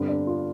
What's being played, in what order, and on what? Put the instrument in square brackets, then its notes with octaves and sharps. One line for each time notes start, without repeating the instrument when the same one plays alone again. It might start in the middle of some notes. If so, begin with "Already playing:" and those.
Already playing: [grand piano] G2 D3 C4
D4
F4